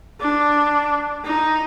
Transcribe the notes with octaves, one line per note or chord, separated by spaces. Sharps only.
D4
D#4